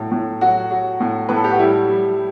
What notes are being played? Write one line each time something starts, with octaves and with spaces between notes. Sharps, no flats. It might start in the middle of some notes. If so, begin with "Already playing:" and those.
Already playing: A2 F#3
A2
F#3 F#4
F#3
A2
A2 B4
A4
G4
F#4
G3 E4
G3